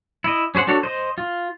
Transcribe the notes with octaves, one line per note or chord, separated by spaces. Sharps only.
E4 D#5
C#4 G#4 C5 F#5
D4 F#4 A4 C#5
C5 D#5
F4